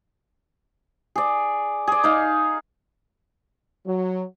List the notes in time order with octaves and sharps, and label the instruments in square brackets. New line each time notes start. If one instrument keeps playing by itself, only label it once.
[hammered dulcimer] G#4 D5
G#4 D5
D#4 F5
[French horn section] F#3